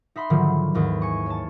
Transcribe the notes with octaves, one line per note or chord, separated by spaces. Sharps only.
D#4 E5 B5 C6
G#2 D3 D#3 F3 F#3
D#2 G#2 E3
G#5 C#6
C#5 A5